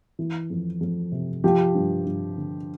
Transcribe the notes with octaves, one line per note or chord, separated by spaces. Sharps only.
E3
F2
F2
C3
F3 G4
G2
G2
D3